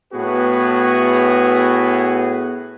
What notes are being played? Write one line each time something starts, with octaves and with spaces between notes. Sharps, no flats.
A2 B3 F#4 G#4 B4